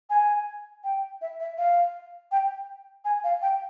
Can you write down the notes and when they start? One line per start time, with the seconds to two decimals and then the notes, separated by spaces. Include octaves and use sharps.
0.10 G#5
0.84 G5
1.21 E5
1.40 E5
1.58 F5
2.32 G5
3.05 G#5
3.24 F5
3.42 G5